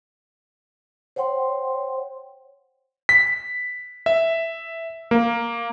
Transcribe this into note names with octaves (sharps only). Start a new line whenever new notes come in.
C5 C#5 F#5 G5 C6
B6
E5
A#3